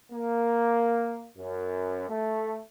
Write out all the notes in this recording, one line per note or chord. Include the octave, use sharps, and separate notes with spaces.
A#3
F#2
A3